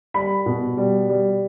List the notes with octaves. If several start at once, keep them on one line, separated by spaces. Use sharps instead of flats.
G3 B5
B2
G3
G3